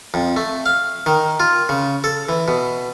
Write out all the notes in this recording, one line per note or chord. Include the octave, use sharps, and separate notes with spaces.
F2
A3
F5
D#3
F4
C#3
A4
E3
B2